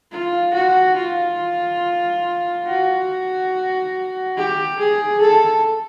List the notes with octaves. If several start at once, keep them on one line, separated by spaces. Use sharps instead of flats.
F4
F#4
F4
F#4
G4
G#4
A4